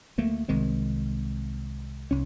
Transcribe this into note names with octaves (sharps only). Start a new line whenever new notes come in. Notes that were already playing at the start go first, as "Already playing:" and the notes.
D2 A3 A#3
C2 D#3 G#3 C4
C2 C#4